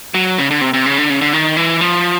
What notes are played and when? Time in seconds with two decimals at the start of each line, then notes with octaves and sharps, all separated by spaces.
0.14 F#3
0.38 C#3
0.51 D3
0.61 C3
0.74 C3
0.86 C#3
0.98 D3
1.10 C#3
1.21 D3
1.33 D#3
1.57 E3
1.81 F3